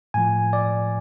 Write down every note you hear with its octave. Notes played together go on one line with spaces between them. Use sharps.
A2 F3 G#5
D5